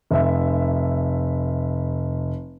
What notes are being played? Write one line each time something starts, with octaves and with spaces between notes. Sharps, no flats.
F1 E5